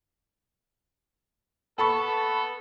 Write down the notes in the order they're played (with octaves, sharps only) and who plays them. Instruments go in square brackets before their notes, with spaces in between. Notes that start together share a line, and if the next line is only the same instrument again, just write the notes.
[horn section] B3 A4 [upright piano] A5 B5 C#6